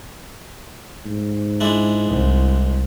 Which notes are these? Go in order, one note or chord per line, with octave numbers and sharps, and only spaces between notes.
G#2
G#3 D4 E4
C2